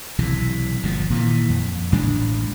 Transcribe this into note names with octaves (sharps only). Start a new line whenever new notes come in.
B1 C3 E3
G1 A#2 D3 F3
A#2 D#3 E3
F2
A1 A2 G#3 D4